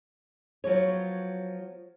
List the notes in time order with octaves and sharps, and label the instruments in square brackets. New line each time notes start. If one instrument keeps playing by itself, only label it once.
[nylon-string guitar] F3 F#3 B3 C#5